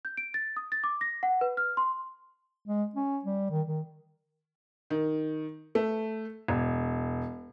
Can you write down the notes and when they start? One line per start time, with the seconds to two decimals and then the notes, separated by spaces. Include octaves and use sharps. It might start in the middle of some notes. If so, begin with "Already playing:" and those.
0.05 G6
0.17 D7
0.34 A6
0.57 D#6
0.72 A6
0.84 D6
1.01 A#6
1.23 F#5
1.41 B4
1.57 F6
1.77 C6
2.66 G#3
2.95 C#4
3.24 G3
3.50 D#3
3.67 D#3
4.90 D#3
5.75 A3
6.48 E1